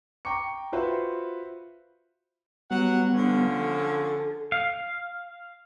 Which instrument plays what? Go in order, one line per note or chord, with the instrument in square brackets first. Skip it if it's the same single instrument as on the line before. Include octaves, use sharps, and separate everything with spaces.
[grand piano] G5 A#5 C#6 D6 C#7
F4 F#4 B4 C5 E5 B5
[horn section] F#3 F#5 [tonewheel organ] G3 B3
[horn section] D3 F3 C#4
[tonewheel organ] A4
[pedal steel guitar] F5